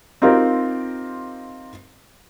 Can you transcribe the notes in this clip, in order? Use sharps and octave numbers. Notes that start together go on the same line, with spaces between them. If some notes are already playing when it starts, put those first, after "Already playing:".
C4 D#4 F4 G4 A#4 C5